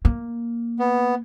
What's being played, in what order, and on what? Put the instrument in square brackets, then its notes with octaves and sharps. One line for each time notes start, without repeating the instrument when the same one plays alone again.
[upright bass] A#3
[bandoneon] B3